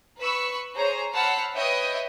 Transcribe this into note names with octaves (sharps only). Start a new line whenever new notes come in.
B4 B5 C#6 E6
G#4 C5 C#5 A#5
C5 F#5 A5 B5 E6 F6
B4 C#5 D#5 E5 G5